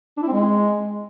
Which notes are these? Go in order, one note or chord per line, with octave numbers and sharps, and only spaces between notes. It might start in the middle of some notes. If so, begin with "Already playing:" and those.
D4
E4
C4
G#3